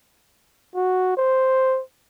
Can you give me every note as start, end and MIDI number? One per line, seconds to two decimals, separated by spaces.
0.75 1.13 66
1.17 1.81 72